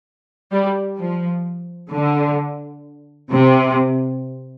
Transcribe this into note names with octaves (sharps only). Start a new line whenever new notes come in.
G3
F3
D3
C3